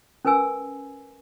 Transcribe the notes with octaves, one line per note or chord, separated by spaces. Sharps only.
C#4 A#4 B4 G#5 E6